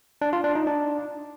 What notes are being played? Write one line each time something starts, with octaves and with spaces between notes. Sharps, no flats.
D4
F4
D4
D#4
D4